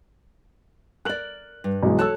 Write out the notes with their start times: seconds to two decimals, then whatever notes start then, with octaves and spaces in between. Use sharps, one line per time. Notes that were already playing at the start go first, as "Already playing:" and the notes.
1.05 A#4 D5 F#6 F#7
1.64 G2
1.83 B1 E3 G#3
1.99 A4 C#5 A5 E6 F#6